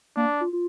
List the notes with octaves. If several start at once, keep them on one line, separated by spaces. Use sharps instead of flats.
A#3 D4
F4
F4